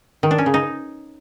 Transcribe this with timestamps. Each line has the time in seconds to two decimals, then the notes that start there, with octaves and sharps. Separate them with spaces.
0.23 D#3
0.31 D4
0.38 C#4
0.46 C#3
0.54 D#4